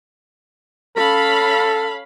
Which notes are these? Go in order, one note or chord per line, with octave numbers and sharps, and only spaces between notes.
C#4 A4 F5 B5